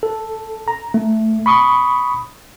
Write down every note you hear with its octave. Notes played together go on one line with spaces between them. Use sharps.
A4
A#5
A3
B5 C#6 D#6